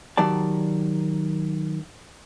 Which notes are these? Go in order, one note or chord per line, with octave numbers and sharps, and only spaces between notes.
D#3 F#3 G4 D5 A5